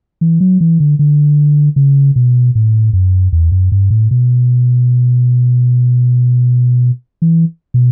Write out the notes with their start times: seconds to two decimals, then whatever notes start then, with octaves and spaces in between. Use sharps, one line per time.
0.21 E3
0.41 F#3
0.61 E3
0.80 D3
0.99 D3
1.76 C#3
2.16 B2
2.55 A2
2.93 F#2
3.32 E2
3.52 F#2
3.72 G2
3.90 A2
4.11 B2
7.22 E3
7.74 B2